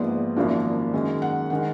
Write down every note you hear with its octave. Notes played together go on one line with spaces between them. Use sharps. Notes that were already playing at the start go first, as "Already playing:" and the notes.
Already playing: A#1 G#2 F3 B3 D5
G#1 F#2 F3 A#3 D4
F#2 D#3 G#3
F#5
D#3 G#3 F#5